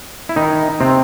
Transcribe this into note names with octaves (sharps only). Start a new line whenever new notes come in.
E4
D#3 D#4
C3 C4